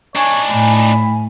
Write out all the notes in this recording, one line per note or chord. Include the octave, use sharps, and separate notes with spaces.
D4 D#4 C#5 G#5
A2 B5